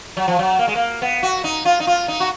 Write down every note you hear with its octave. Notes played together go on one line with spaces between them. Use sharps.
F#3
F3
F#3
A#3
G#3
A#3
B3
F#4
D#4
F4
D#4
F4
D#4
F#4